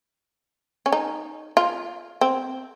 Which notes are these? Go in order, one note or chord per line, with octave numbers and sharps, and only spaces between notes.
C#4
D#4
F4
C4